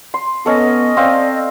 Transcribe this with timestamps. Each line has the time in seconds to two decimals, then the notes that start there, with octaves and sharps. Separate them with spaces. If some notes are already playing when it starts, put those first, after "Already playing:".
0.14 C6
0.46 B3 C#4 A4 D#5
0.97 C4 D5 F5